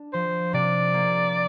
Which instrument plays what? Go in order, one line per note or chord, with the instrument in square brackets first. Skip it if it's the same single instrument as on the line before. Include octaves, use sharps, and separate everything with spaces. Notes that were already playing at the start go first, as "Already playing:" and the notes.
Already playing: [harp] D4
[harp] F3 [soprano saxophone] C5
[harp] C3 [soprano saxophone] D5
[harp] A#3